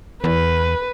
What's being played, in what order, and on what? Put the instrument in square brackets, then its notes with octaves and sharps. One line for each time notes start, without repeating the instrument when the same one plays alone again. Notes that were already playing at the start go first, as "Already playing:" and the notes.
[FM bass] E2 [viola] B4